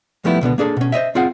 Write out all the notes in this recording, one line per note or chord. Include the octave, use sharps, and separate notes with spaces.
F3 G3 A3 B3 E4
C#2 B2 D3 B3
A#3 D4 G#4 A4
B2 C#4
C5 C#5 D#5 E5
C4 F4 G#4 F5 F#5